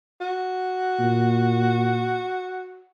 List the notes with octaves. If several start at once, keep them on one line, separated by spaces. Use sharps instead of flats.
F#4
A#2